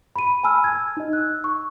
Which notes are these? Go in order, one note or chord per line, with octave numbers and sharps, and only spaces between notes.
B5 D#7
G#5 A5 B5 E6 F6
G#6
D#4 D#5
E6 F#6
C#6